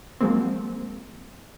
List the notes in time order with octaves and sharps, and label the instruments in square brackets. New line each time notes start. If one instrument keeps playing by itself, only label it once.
[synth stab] F3 F#3 G#3 A#3 C4